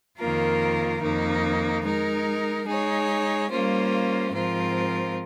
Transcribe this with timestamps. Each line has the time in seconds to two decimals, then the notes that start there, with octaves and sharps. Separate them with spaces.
0.18 F2 D#3 A#3 F4 A#4
1.01 F2 D#3 A#3 D#4
1.83 G#3 D#4 A#4
2.66 G#3 D#4 G#4 C#5
3.49 G3 A#3 C#4 F4 C5
4.32 G#2 F3 C4 F4 A#4